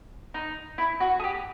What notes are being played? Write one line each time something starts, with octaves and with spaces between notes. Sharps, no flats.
D#4
E4
F#4
G#4
G4